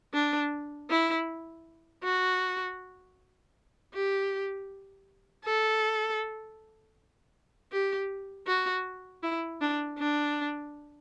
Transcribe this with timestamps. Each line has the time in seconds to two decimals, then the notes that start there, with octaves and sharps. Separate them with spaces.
0.14 D4
0.90 E4
2.03 F#4
3.94 G4
5.45 A4
7.72 G4
8.47 F#4
9.23 E4
9.61 D4
9.99 D4